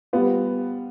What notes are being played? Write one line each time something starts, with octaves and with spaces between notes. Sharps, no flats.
G3 B3 F4